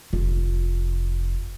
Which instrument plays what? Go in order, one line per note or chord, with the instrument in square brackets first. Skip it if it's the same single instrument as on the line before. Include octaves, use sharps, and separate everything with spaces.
[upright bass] F1 F4